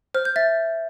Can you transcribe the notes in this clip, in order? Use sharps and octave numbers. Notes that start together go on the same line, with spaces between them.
C5 F6
G6
E5 A6